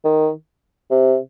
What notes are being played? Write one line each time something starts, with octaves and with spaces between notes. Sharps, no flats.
D#3
C3